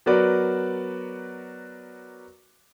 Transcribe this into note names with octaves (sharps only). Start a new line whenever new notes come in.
F#3 B3 F#4 A#4 B4 D5